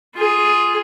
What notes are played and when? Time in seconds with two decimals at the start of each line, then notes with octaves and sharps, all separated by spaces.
0.16 F4 G#4